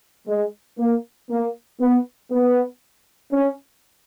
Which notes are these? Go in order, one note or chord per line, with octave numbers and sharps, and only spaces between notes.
G#3
A#3
A#3
B3
B3
C#4